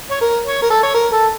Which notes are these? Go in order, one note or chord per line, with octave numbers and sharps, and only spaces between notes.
C#5
A#4
C#5
A#4
A4
C#5
A#4
A4